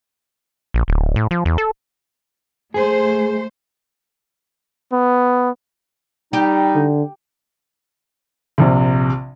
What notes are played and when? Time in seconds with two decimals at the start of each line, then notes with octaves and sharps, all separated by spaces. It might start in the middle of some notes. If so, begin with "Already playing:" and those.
0.74 A#1
0.88 D1
1.16 A2
1.31 F3
1.45 E2
1.58 A4
2.74 A3 G#4 C5
4.92 B3
6.33 G3 D#4 G4
6.75 D3
8.58 A#1 C3